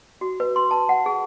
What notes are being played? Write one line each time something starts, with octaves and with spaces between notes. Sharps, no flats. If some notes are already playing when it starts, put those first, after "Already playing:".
F#4
B4
C6
A5
F#5
G#4